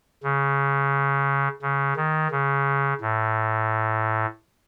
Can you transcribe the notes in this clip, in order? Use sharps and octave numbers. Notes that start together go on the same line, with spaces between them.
C#3
C#3
D#3
C#3
A2